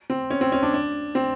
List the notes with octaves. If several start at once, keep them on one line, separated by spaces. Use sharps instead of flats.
C4
C#4
C4
C#4
D4
D4
C4